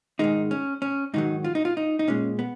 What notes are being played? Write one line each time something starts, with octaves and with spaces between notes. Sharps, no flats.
G#2 D#3 G#3 D#4
C#4
C#4
G#2 D#3 F#3 D#4
F4
D#4
F4
D#4
D#4
A#2 G#3 C#4
B3